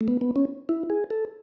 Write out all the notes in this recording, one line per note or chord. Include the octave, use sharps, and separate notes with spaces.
A3
B3
B3
C#4
E4
G#4
A4